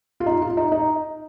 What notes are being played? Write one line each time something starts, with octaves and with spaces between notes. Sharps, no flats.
F4
D#4
F4
D#4
D#4